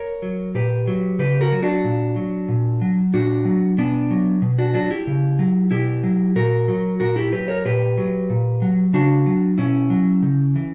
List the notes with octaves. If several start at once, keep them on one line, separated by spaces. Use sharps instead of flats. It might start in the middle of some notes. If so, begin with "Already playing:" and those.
Already playing: A#4 C#5
F#3
A#2 G4 B4
F#3
C#3 G4 B4
F#4 A#4
F#3
D4 F#4
A#2
F#3
A#2
F#3
A#2 D4 F#4
F#3
B2 B3 D4
F#3
B2
D4 F#4
F#3 D4 F#4
E4 G4
C#3
F#3
B2 E4 G4
F#3
A#2 F#4 A#4
F#3
A#2 F#4 A#4
E4 G4
F#3 G4 B4
A#4 C#5
A#2 G4 B4
F#3
A#2
F#3
C#3 D4 F#4
F#3
B2 C#4 E4
F#3
C#3
E3